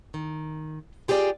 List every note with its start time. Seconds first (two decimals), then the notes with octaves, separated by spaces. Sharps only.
0.14 D#3
1.08 F4 G4 G#4 A#4 D5 G5